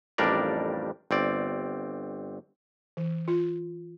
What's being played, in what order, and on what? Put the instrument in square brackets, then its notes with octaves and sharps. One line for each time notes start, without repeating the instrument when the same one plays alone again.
[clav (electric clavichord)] A1 F2 G3 D4 A#4 D5
G1 C4 D5
[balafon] E3
F4